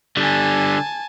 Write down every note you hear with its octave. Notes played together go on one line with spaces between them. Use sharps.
D3 G3 G#5 A5